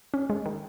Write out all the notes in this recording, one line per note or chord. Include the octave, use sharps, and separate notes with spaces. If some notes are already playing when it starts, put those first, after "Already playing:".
C#4
G#3
D#3